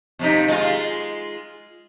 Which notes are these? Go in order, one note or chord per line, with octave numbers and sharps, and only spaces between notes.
F2 C3 D#4
G#3 F4